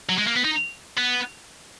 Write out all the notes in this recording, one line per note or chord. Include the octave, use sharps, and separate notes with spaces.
F#3
G#3
A#3
B3
D#4
B3